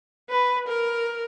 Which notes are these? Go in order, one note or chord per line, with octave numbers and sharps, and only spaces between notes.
B4
A#4